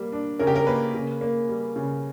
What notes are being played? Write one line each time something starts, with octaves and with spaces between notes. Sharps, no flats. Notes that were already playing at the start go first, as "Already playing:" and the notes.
Already playing: G3 A#3
D4
C#3 A#4
G4
A#4
A#3 B4
C#3
A#3
G3
C#3